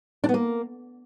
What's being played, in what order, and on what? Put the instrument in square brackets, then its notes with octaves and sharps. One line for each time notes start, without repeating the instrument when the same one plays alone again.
[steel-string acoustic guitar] D4
B3
A#3